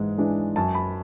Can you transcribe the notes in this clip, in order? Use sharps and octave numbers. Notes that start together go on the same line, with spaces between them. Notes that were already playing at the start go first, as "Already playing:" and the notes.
Already playing: G#2 E3 G#3
E3 G#3 D4
F#2 A5
B5